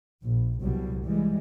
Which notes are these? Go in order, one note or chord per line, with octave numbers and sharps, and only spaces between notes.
A#1
C2 B2 F#3 G3
E3 G3 G#3